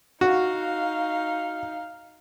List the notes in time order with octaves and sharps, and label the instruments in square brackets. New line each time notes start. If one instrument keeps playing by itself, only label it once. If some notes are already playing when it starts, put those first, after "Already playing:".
[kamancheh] D#4 F5 [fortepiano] F#4